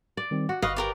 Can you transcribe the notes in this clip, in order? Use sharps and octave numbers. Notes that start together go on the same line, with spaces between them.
D5
D#3 G3 C4
F#4 F#5
G1 B4 D#5 F5 C#6
G4 A#4 D5